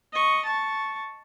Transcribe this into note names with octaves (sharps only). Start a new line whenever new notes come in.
D#5 C#6
A5 C#6